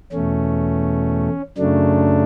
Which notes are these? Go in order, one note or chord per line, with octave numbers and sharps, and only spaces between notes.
E2 B2 A3 C#4
F#2 C#3 F#3 A3 D4